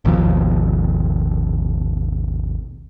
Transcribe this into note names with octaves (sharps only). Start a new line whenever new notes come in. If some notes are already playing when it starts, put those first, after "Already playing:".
G#1 D#2 B2 F3